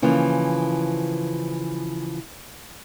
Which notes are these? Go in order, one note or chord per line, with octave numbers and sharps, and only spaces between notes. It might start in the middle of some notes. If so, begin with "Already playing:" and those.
C#3 E3 F3 A#3